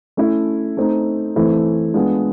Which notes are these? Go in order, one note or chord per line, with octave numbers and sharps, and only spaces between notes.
A3 C#4 E4
A3 C4 D#4
E3 A3 C4 E4
G#3 B3 D4 F4